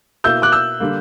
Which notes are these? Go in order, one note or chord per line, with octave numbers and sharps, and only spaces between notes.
B2 A#3 E4 E6 G6
D6 F#6
E6 G6
D3 G3 A#3